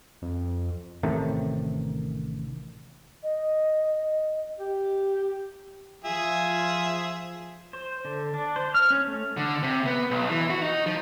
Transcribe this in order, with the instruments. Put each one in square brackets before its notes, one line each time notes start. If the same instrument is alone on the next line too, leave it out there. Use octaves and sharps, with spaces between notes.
[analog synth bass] F2
[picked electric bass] A1 C3 D#3 A3
[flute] D#5
[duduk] G4
[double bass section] F3 [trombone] F4 [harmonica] G#4 E5
[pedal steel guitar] C5
D3
D4
C5
F6
C#4
A3
[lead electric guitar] D3
C3
B3
B1
E3
F#4
D#4
F3